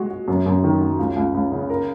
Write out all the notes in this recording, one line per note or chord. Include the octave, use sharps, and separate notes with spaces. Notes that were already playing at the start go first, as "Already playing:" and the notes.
Already playing: G#3 F#4
F#4
F#2
F#2
D#3
F#3
C#2
C#2
C#2
C#3
A#4